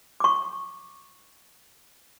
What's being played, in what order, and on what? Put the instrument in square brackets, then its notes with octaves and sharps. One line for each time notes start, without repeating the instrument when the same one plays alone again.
[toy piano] C#6 D6